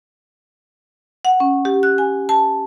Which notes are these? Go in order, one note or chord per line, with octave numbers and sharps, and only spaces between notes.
F#5
C#4
G4
F#6
G#5
A5